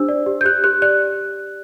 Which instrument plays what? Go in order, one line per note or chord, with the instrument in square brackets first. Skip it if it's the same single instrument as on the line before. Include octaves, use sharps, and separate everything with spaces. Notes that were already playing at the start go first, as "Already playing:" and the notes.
Already playing: [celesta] D4 G4 C5 E6
D5
G4
G6
G4 F#6
G4 F#6
D5 F#6